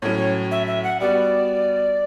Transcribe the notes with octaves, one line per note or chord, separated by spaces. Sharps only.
A2 F#3 C#4 C#5
C#5
E5
E5
F#5
G3 B3 F#4 D5